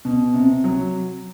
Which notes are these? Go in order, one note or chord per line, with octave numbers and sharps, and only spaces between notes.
B2
C3
F#3